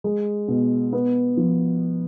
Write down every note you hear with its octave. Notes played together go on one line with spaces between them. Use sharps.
G#3
B2
B3
F3